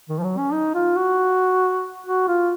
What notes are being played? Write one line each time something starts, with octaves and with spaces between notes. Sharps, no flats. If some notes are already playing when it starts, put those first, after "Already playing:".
D#3
F3
F#3
C#4
D#4
F4
F#4
F#4
F4